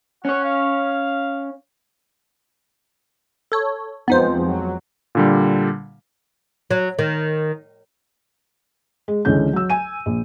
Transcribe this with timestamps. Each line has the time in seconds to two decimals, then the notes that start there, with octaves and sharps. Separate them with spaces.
0.25 C#4 C#5 F#5
0.44 F5
3.52 A4 C#5
4.08 F2 F3 G#3 B3 D#4 C5
4.46 F#3
5.15 A#2 D3 G3
6.70 F#3
6.99 D#3
9.08 G#3
9.25 C#2 D3 E3 C#4 G6
9.53 F#3 E6
9.70 G#5 D#7
10.06 A#1